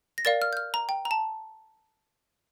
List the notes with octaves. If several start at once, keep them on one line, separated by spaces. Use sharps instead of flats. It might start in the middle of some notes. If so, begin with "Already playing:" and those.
A#6
A#4 D5 F5 A6
F6
G6
F6
A#5
G5
A#5
A5